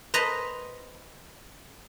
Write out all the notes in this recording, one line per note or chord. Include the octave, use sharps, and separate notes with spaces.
B4 C5 D#5 A5 A#5